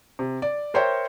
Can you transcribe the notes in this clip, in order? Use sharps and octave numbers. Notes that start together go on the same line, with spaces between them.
C3
D5
A#4 C5 C#5 E5 G5